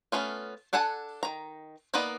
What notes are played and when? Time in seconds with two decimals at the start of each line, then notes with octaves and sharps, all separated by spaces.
0.12 A3 B3 C#4 F4
0.73 D4 A4 F#5 G#5 A5
1.23 D#3 A#5
1.94 A#3 B3 D#4 B4 D5